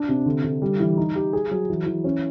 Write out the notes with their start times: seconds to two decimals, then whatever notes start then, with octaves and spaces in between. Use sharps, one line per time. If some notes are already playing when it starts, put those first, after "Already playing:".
Already playing: D4
0.09 C3
0.26 D3
0.44 D3
0.62 G3
0.80 E3
0.97 D#4
1.15 G4
1.33 G#4
1.51 F#3
1.70 E3
1.86 E3
2.04 C#4